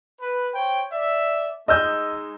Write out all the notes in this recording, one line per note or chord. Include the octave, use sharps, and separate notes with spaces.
B4
C5 C#5 G5
D5 E5
G#3 D#4 D#5 E6 G6